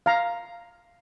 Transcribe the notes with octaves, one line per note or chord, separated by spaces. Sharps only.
F5 A#5